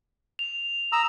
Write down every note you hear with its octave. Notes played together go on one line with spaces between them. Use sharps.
F7
A#5 D#6 E6